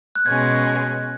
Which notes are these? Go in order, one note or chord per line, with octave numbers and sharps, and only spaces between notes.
F#6
B2 G#3 C#4 G#6